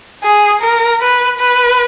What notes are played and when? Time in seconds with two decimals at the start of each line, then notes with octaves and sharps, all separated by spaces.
0.24 G#4
0.62 A#4
1.01 B4
1.39 B4